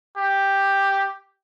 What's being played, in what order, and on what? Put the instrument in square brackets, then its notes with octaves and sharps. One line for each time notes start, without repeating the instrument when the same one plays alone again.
[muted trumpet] G4